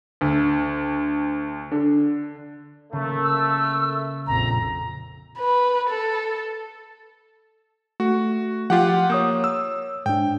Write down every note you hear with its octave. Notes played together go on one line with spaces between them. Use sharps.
D2
D3
C#3 A3 A#3
E6
A#1 F2 A#5
B4
A4
A3 F#4
F3 F4 G4 F#5
A#3 C#5 D#6 G6
E6
G#2 D4 G5